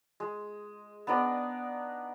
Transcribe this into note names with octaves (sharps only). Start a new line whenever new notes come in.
G#3
B3 D4 D#4 D5